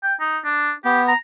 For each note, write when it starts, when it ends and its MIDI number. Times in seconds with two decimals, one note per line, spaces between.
0.03 0.14 79
0.21 0.38 63
0.44 0.72 62
0.85 1.13 59
0.85 1.02 67
1.08 1.17 82